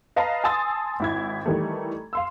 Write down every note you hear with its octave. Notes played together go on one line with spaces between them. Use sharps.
B4 D#5 F5 A5 A#5
G#5 A5 C6 D#6 E6 A6
G#1 E4 G#6
D#3 E3 G3 A3
F5 C6 E6